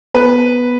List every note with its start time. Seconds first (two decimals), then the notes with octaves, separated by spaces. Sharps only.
0.14 B3 B4